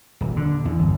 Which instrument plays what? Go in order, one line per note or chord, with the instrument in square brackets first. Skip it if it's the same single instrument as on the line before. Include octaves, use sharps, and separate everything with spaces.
[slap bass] D#1
D3
E2
G1